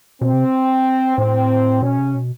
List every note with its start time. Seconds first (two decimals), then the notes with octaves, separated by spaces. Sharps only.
0.21 B2 C4
0.33 C3
1.18 A2 C4
1.82 B2 C#4
1.98 C3
2.15 B2